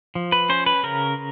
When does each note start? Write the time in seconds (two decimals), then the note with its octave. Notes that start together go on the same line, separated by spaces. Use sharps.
0.15 F3
0.32 B4
0.49 C#4 C5
0.66 B4
0.83 C#3 A#4